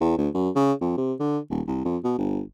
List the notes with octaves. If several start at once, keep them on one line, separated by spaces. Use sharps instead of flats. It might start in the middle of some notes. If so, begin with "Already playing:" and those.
E2
D2
F#2
C#3
F2
C3
D3
D#1
C2
F2
B2
G1